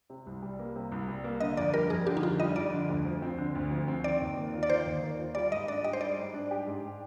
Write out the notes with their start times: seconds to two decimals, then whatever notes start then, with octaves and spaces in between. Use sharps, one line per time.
0.10 C3
0.26 C2
0.42 G3
0.59 A#3
0.75 C3
0.92 C2
1.08 G3
1.24 A#3
1.41 D3 D#5
1.57 F2 D5
1.73 G3 A#4
1.90 F2 G#4
2.07 D3 G4
2.17 D#4
2.23 F2 F4
2.40 G3 D#5
2.56 F2 D5
2.72 D3
2.89 D2
3.05 F3
3.22 C4
3.38 D3
3.55 D2
3.71 F3
3.88 C4
4.04 D#3 D5
4.21 D#2
4.36 A#3
4.54 F4
4.63 D5
4.70 D#3 C5
4.86 D#2
5.02 A#3
5.19 F4
5.35 G3 D5
5.51 G#2 D#5
5.68 D4 D5
5.84 G4 D#5
5.93 C5
6.01 G3 D5
6.18 G#2
6.34 D4
6.51 G4
6.66 G#2